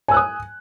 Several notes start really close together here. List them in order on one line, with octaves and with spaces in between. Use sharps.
G#5 E6 F#6 D#6